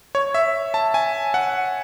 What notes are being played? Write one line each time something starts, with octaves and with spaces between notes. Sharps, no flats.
C#5
E5
A5
G#5
F#5